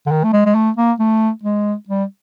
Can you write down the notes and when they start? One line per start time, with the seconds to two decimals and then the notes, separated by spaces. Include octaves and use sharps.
0.06 D3
0.11 D#3
0.24 A3
0.33 G#3
0.46 G#3
0.55 A3
0.77 A#3
0.99 A3
1.43 G#3
1.89 G3